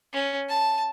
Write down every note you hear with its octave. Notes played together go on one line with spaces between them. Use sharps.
C#4
A5